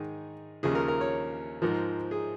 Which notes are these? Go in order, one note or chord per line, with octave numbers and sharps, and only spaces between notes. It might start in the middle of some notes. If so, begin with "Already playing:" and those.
Already playing: G#2 D#3 G#4
D#2 C#3 F3 G#4
A#4
A#4
C#5
G#2 F3 A#4
G#4